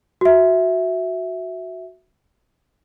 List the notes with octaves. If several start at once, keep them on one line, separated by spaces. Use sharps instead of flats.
F#4 E5